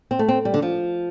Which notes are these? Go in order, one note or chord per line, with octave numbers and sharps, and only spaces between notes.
C4
A3
C4
G3
D3
F3